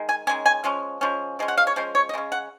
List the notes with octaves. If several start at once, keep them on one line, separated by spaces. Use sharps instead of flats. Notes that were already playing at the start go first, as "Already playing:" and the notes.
Already playing: D#3 G#3
G#5
D#3 G#3 C#4 G#5
G#5
F3 G#3 C#4
F3 G#3 C#4
F3 G#3 C#4
F#5
F5
C#5
F3 G#3 C#4 C5
C#5
D#5
C#3 G#3 C#4
F#5